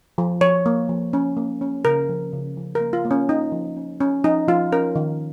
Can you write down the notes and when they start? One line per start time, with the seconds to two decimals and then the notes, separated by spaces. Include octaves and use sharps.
0.18 F3
0.41 F3 C#5
0.66 A#3
0.89 F3
1.13 C#4
1.37 A#3
1.61 C#4
1.85 C#3 A#4
2.09 F3
2.33 C#3
2.57 F3
2.75 A#4
2.80 A#3
2.93 F4
3.05 A#3
3.11 C#4
3.29 C#4 D#4
3.52 F3
3.76 C#4
4.01 C#4
4.24 F3 D#4
4.48 F3 F4
4.72 C#4 A#4
4.95 D#3